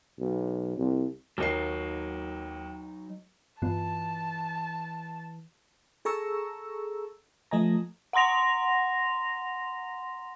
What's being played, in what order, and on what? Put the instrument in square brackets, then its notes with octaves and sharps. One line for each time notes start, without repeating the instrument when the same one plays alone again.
[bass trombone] B1
C2
[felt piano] D#2 A#3 C7 [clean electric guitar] F#3 D#4
[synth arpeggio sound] G2 B3 F4 [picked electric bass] E3 [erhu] A5
[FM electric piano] G#4 A4 A#5 C#6 E6
F3 A3 D#5 G#5 A#5
[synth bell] F#5 A#5 C6 A#6 F7